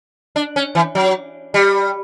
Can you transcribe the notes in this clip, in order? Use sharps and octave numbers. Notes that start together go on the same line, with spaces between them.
D4
C#4
E3
F#3
G3